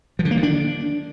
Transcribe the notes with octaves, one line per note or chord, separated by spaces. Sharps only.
F3
D3
A#3
D#3
D4